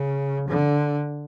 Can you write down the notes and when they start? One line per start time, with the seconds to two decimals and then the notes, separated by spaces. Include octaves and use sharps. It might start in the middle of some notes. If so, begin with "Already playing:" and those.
Already playing: C#3
0.48 D3